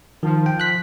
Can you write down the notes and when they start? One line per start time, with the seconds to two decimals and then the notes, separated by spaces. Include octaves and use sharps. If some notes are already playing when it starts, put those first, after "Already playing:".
0.23 D#3 F3
0.46 G5
0.60 F#6 B6